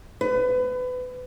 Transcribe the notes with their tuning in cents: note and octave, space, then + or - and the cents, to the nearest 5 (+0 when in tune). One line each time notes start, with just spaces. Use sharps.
B4 +30